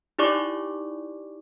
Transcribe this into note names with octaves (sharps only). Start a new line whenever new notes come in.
D#4 E4 G4 D5 C#6 D6